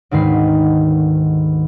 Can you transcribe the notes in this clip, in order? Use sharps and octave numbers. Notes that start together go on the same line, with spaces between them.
D2 G#2 D#3 B4 C7